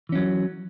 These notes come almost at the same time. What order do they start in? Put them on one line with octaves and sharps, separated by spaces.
E3 C#4 F#3